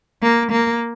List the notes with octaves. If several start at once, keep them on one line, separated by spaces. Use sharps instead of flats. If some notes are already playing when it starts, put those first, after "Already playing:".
A#3
A#3